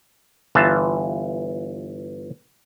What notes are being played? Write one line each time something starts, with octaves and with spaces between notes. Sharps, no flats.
G1 E3 F4 A5